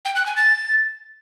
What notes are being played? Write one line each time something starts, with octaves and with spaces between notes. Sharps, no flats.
G5
F#6
G#5
A6